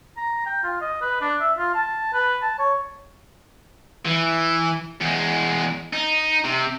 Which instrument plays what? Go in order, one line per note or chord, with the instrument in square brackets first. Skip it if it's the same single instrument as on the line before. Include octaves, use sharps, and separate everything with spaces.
[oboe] A#5
G5
F4
D#5
B4
D4
E5
F4
A5
B4
A5
C#5
[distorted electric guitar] E3
E2 G#3
D#4
C3